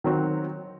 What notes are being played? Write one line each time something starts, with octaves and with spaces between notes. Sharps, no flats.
D#3 F#3 C4 F#4